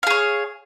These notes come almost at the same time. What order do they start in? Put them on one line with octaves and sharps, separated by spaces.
F5 G#4 C#5